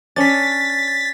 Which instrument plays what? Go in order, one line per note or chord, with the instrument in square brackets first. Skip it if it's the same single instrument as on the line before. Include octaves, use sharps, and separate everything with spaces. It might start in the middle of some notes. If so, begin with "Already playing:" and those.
[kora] C#4 D4 [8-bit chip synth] A6 B6